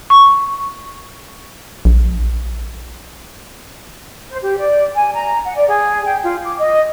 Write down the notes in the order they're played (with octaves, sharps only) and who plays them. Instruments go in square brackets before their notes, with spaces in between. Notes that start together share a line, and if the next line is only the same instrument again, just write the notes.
[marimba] C#6
[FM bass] A#1
[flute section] C5
G4
D5
G#5
A#5
F#5
D5
G#4
G5
F4
D6
D#5